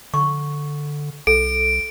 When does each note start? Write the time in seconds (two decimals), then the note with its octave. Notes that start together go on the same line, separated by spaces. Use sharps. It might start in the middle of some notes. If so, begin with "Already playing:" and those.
0.14 D3 C#6
1.27 C2 A4 D7